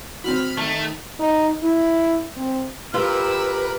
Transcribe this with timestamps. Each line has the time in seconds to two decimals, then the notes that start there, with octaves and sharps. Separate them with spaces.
0.24 C4 F#4 B5 F6
0.57 D#3 A3
1.19 D#4
1.63 E4
2.37 C4
2.94 F4 G4 A#4 B4 E6